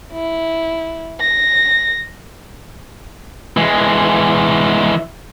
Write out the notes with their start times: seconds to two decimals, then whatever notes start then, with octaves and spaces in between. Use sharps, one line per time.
0.13 E4
1.21 A#6
3.57 E3 G#3